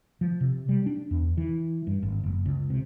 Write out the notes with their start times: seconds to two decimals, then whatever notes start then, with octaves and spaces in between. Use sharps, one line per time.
0.21 F3
0.41 C3
0.69 G3
0.86 D4
1.11 E2
1.37 E3
1.87 G2
2.03 G#1
2.24 F#1
2.46 C#2
2.70 C3